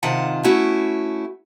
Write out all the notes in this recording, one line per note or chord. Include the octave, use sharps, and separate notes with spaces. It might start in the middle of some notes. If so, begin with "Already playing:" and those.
C3 D#3 F4 F#5 A5
A3 C#4 E4 F#4